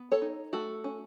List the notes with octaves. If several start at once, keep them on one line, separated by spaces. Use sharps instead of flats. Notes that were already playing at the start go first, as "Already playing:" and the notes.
Already playing: B3
A4 C#5
D#4
A3 F#4 A4
C#4